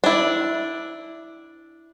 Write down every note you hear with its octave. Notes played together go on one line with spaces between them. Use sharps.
D4 E4